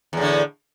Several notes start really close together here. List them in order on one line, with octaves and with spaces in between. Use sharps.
E2 A2 D3